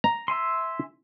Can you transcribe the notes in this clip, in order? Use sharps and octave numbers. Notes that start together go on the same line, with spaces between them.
A#5
E5 G#5 C6